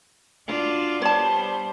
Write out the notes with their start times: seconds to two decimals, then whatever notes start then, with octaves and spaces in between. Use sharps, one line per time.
0.47 D4 F4 F#4
1.02 G3 B3 C5 C#5 A5